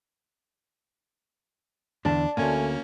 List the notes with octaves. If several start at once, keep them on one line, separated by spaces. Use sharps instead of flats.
E2 D3 D4 D5 A5
D2 G#2 A3 A#3 C#4 G#5